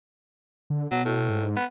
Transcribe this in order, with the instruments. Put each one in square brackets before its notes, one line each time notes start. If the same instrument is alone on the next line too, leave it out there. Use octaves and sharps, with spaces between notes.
[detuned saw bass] D3
[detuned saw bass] B2 [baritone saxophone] F#3
[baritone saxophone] A2
[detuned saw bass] G#2
[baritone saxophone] B3